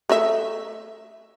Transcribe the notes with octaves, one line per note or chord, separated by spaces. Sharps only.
A3 D#5 E5